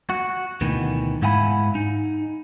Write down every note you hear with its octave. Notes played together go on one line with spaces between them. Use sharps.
F#4
D2 B2 D#3 E3
G#2 E4 F5 F#5 G#5 B5
D#4